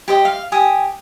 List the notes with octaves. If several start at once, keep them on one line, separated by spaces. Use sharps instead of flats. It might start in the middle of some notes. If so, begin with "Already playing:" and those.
G4 C5 D#5
F5
G4 G#5 D#6